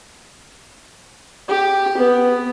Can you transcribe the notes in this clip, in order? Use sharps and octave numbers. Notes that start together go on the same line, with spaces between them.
G4
B3